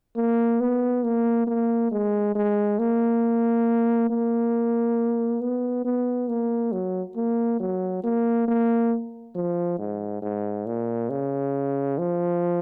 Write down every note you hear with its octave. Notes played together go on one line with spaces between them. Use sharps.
A#3
B3
A#3
A#3
G#3
G#3
A#3
A#3
B3
B3
A#3
F#3
A#3
F#3
A#3
A#3
F3
G#2
G#2
A#2
C#3
F3